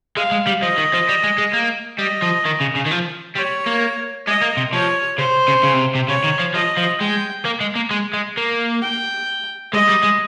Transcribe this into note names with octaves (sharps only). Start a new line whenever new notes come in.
G#3 F5
G#3
G3
F3 D#5
D#3
F3
G3
G#3
G#3
A#3
G3 D#5
F3
D#3
C#3
C#3
D#3
F3
G3 C#5
A#3
G#3 D#5
A#3
C3
F3 C#5
C#3 C5
C#3
C#3
C3
C3
C#3 C#5
D#3
F3
F3 D#5
F3
G#3 G5
A#3
G#3
A#3
G#3
G#3
A#3
G5
G#3 D#5
G3
G#3